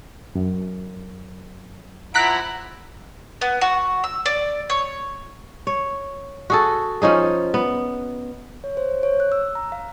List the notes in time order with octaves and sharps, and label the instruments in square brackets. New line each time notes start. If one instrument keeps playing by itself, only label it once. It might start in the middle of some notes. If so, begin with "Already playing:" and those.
[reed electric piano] F#2
[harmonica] F3 E4 F#5 [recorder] A#5 [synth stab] F#6 B6 D7
[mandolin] B3
F#4
E6
D5
C#5
[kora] C#5
F#4 G#4 A4
F3 C#4 D#4 G#4
B3
[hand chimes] C#5
C5
C#5
F#6
E6
A#5
F5